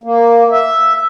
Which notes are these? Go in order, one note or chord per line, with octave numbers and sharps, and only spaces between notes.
A#3
E5